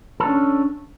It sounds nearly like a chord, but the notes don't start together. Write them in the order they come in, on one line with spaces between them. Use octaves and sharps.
A4 D4 C#4